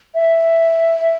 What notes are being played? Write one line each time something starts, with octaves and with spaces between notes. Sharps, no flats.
E5